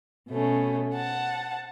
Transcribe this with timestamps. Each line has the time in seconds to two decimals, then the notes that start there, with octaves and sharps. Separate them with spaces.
0.29 B2 A3 C#4
0.95 F#5 A5